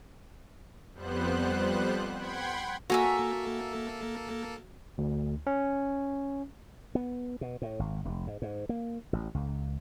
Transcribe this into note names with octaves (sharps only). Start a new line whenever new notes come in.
F2 G3 B3 C5 F#6
F#5 G5 B5 C6 G#6
A#3 F#4 A4 E5 G#5 A#5
D2
C#4
B3
B2
A2
G#1
F1
G#2
G#2
A#3
A1
C#2